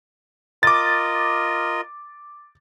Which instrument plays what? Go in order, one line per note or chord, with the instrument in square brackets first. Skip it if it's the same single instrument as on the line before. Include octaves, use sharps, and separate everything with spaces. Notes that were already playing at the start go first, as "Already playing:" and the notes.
[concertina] F4 A#4 D#5 [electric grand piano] D6 A6